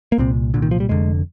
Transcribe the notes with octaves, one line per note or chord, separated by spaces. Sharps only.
A#3
C2 A#2 C4
C2 A#2 D3
D#3
F3
G3
F1 F2 D3 G#3